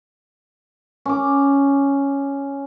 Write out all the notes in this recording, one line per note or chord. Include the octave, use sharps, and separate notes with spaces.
C#4 D6